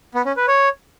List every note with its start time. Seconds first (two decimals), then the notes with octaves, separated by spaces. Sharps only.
0.14 B3
0.25 C#4
0.37 B4
0.48 C#5